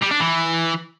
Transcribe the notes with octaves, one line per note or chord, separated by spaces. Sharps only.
G3
D4
E3